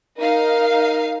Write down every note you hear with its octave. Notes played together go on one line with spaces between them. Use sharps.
D#4 A#4 F5